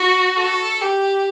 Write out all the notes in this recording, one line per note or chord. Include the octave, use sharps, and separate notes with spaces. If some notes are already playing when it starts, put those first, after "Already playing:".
Already playing: F#4
A4
G4